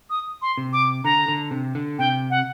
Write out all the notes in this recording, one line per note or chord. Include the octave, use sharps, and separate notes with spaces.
D#6
C6
C3
D6
D3 A#5
D3
C3
D3
C3 G5
F#5